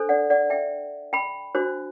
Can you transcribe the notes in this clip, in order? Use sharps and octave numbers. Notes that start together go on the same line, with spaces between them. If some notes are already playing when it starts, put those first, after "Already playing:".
Already playing: D4 A4 C5
D5 F#5
D5 F#5
E5 G5
G5 B5
D4 F#4 C5